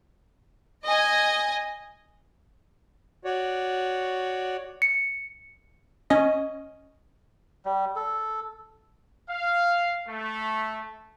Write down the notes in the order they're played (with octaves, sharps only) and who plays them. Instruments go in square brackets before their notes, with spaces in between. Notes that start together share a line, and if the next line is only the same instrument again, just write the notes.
[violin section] D#5 G#5
[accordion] F#4 C#5 D5
[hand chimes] C#7
[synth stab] C#4 D#5
[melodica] G3
A4
[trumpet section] F5
A3